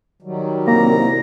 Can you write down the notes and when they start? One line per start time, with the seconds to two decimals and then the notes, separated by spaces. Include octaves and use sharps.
0.22 D#3 F#3 G3
0.68 C2 A#3 A#5